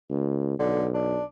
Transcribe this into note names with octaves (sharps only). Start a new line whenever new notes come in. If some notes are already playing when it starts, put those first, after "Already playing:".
C#2
B1 D3
D4